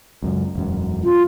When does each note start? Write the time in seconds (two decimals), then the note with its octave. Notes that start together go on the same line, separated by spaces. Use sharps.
0.23 C#2 F#2
0.56 E1 F#2
1.04 F4